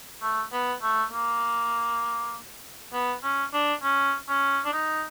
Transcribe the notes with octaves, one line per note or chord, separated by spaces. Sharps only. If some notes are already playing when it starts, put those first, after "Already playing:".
A3
B3
A3
A#3
B3
C#4
D4
C#4
C#4
D4
D#4